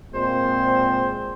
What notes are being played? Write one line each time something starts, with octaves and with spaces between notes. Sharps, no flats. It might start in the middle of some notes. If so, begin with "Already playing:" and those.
A#2 G#3 C4 C5